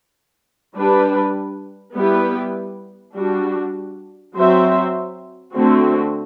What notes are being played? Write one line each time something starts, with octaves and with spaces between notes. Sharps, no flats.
G3 D4 G4 B4
G3 B3 E4 G4 B4
G3 D4 F#4
F#3 C4 F#4 C5 E5
D3 A3 C4 F#4